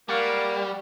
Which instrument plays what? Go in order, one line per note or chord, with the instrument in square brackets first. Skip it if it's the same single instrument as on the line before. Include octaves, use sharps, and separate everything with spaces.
[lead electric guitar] G3 [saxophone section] A#3 [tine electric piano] D5 F#5 C#6